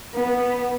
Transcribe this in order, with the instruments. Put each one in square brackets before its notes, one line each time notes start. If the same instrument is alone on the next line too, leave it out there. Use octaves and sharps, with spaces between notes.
[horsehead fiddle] B3